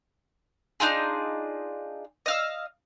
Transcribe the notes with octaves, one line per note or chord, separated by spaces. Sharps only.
D4 D#4 F4 G#4
D#5 F5 E6